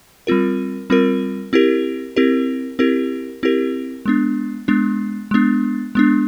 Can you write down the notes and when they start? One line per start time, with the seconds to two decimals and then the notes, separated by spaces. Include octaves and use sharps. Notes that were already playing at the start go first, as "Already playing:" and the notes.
0.27 G3 C4 F4 A#4
0.90 G3 C4 F4 A#4
1.53 C4 E4 G4 A#4
2.16 C4 E4 G4 A#4
2.79 C4 E4 G4 A#4
3.43 C4 E4 G4 A#4
4.06 G#3 B3 D4
4.68 G#3 B3 D4
5.31 G#3 B3 D4
5.95 G#3 B3 D4